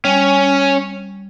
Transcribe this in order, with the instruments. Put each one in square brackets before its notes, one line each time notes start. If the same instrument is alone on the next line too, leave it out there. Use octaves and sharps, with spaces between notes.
[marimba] G3 [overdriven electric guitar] C#4